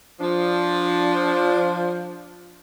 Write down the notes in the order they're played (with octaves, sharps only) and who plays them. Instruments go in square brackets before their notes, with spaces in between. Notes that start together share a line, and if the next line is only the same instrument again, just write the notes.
[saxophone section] F3 D4